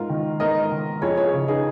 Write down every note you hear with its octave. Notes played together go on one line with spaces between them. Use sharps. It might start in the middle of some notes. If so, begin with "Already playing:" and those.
Already playing: G#2 F4 A#4
D#3
G#2 A#4 D#5
D#3
F2 G#4 C#5
G#4 C#5
C#3
D#4 G#4